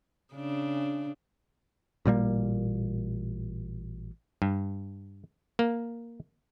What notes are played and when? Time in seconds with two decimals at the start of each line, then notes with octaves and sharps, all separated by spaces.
0.34 C#3 D4
2.05 A1 A#2 G3 A#3
4.42 G2
5.59 A#3